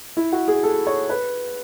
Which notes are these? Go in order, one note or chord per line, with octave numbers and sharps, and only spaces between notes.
E4
F#4
G#4
A4
C#5
B4